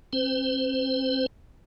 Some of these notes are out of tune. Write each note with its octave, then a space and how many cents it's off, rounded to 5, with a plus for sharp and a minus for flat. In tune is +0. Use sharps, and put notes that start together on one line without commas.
C4 +35 C5 -30